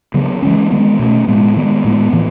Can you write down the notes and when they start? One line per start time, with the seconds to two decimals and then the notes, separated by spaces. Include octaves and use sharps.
0.14 C#3 F#3 B3
0.42 E3 G#3 C#4
0.71 D#3 G#3 B3
0.99 B2 A3 C#4
1.28 A2 G#3 B3
1.56 D#3 G#3 B3
1.84 A2 G#3 B3
2.13 A2 E3 B3